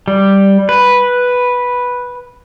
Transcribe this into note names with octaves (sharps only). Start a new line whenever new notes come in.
G3
B4